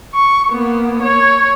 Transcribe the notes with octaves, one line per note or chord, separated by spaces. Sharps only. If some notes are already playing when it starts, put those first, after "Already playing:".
C#6
A#3 B3
C#5